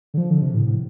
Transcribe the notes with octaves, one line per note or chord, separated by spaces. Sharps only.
D3
F3
D3
C3
A2
A2